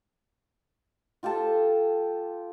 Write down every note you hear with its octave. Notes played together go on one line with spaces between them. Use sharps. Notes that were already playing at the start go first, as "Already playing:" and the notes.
F4 G4 A4 A5